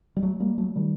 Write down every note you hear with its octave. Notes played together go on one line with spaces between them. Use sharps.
G3
F#3 A3
G3 A#3
F#3 A3
D#3 G3